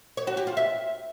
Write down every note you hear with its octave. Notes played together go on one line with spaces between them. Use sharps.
C#5
F#4
G4
F4
E5